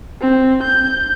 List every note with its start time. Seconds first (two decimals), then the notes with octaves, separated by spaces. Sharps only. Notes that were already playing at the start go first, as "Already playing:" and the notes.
0.21 C4
0.63 G6